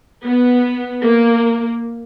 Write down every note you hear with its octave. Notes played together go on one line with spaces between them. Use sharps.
B3
A#3